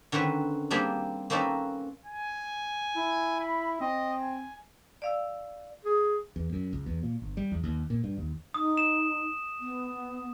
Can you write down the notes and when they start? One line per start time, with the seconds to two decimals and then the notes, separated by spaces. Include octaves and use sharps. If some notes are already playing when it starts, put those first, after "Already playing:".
0.12 D3 D#3 C4 C#4 B4
0.71 G3 A#3 C4 D4 G4 G#4
1.30 A#3 C4 C#4 D#4 A4 B4
2.06 G#5
2.96 E4
3.40 B5
3.81 C4 D#5
4.21 G#5
5.02 D5 F5 E6
5.84 G#4
6.36 E2
6.53 F#2
6.73 C#2
6.86 E2
7.03 A#2
7.22 G1
7.37 G3
7.52 E2
7.64 D#2
7.90 A#2
8.04 G2
8.18 D#2
8.54 D#4 D#6
8.77 E7
9.60 B3